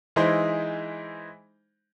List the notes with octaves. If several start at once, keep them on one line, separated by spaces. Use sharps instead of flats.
E3 G#3 D#4 E4 G#4 C5